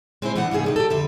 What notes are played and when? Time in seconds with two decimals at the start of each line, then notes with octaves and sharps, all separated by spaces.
0.22 G#3 C4 D4 E4 C5
0.36 E3 B3 D4 F#5
0.51 G#2 C3 A#3 G#4 E5
0.64 G3 D#4 D#5
0.76 G4 A4
0.90 F2 D3 E5